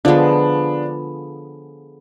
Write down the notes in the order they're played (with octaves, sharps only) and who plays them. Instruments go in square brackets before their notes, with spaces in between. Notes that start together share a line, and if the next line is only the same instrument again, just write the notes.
[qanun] D3 F3 G#3 B3 [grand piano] D4